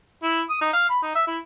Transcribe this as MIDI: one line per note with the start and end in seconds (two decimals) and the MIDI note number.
0.23 0.41 64
0.50 0.61 87
0.61 0.70 63
0.73 0.87 77
0.89 1.01 83
1.02 1.15 63
1.15 1.24 76
1.27 1.38 64